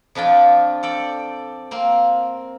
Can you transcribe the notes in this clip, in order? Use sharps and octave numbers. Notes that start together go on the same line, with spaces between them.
F2 F3 D4 F4 G5
A4 D5 G5
A#3 C4